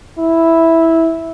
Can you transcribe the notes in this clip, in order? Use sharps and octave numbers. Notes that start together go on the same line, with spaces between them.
E4